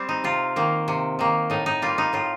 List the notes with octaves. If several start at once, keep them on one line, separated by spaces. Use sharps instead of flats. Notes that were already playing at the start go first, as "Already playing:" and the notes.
Already playing: G3 C4
D#4
C3 F4
D#3 A#3
C3
D#3 A#3
A2 D#4
D#4
G3 A#3 F4
D#4
A2 F4